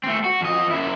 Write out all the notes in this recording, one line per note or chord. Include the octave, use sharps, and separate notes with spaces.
A3 C4
F#4
F2 D#5
F#2 E4